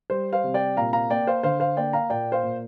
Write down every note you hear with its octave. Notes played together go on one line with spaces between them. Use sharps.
G3 C5
C5 F5
C3
D5 G5
A#2 F5 A#5
F5 A#5
A#3 D5 G5
C5 F5
D3 C5 F5
C5 F5
A#3 D5 G5
F5 A#5
A#2 D5 G5
C5 F5
A#2